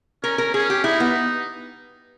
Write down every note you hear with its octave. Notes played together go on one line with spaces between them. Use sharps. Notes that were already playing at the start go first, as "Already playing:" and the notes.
C#4 A#4
A#4
C#4 G#4
G4
D#4 E4
B3